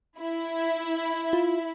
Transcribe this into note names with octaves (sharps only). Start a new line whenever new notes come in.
E4
F4